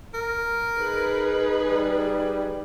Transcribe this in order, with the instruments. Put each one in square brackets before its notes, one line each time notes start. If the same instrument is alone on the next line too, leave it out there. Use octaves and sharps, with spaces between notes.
[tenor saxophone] A#4
[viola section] D#4 G#4 B4
[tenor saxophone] G3